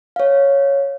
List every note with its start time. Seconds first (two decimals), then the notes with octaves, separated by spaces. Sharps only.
0.16 C#5 F5